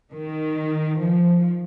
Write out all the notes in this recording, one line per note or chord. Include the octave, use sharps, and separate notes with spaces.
D#3
F3